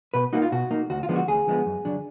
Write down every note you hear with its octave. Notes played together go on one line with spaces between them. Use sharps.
B2 B4
A#3 D#4 F#4
F4
B2 F#4
A#3 D#4
D2 F#4
F4
D3 F3 G#3 B3
F#4
D2 G#4
D3 F3 G#3 B3
F#2
D3 F#3 D4